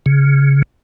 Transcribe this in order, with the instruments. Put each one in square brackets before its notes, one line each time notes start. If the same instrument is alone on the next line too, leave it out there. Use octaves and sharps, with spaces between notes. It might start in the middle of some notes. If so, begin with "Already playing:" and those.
[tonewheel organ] C#3